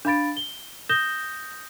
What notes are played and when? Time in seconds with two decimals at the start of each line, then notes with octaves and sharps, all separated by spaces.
0.05 D4 F5 B5 A6 D7
0.37 G7
0.89 D#6 G6 A#6 E7 G7